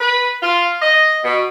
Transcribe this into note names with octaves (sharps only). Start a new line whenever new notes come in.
B4
F4
D#5
B2